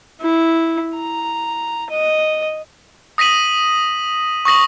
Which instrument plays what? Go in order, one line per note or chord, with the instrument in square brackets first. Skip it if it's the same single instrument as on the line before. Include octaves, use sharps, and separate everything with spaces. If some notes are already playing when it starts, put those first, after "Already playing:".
[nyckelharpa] E4
A#5
D#5
[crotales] D#6 A#6 B6 D#7 F#7
C#6 D#6 A#6 F#7